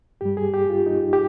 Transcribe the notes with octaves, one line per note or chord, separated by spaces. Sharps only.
G2 G3 G4
G#4
G4
F4
D#4
G4